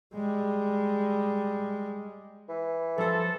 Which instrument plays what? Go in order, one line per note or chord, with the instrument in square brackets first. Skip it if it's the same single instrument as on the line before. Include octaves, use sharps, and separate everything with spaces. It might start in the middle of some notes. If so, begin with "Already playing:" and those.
[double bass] G3 G#3
[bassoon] E3
[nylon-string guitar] F3 C5 [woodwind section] A4